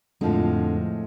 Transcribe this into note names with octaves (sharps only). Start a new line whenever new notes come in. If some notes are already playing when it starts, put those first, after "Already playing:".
F2 A2 D3 F3 G#3